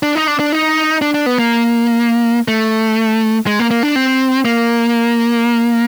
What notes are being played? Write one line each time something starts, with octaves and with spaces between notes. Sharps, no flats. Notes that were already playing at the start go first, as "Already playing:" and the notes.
D4
D#4
D4
D4
D#4
D4
D4
B3
A#3
A3
G#3
A#3
A#3
D4
C4
A#3